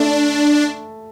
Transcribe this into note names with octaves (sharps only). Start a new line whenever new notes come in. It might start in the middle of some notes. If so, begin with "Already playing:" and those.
Already playing: A3 D4